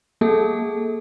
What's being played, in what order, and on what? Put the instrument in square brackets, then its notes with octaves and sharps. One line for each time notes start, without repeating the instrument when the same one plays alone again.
[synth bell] A#3 G#4 A4